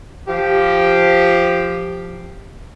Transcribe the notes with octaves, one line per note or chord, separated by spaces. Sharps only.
F3 G4